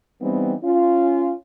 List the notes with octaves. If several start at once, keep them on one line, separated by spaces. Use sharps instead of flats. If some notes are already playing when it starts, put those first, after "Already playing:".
E3 G3 B3 C4 D#4
C#4 F4